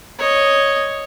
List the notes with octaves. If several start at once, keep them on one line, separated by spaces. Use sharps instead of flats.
C#5 D#5